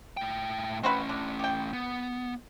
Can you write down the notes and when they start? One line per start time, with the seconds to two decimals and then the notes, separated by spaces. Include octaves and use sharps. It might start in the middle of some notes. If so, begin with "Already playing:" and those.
0.17 A2 G5
0.83 A3 C4 C#4 F#4 B4
1.09 D3
1.39 G4 G5
1.73 B3